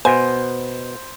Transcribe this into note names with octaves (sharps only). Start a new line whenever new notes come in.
B2 B3 C5 G#5